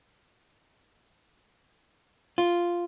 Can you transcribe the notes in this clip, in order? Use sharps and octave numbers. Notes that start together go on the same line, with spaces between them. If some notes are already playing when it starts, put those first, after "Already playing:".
F4